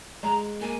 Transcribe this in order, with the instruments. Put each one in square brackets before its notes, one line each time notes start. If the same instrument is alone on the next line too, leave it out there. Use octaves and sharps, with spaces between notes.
[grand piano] G#3 [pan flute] A#5
[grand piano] A#3 [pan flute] G#5